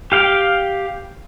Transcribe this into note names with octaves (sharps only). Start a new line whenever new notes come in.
G4 F5 G5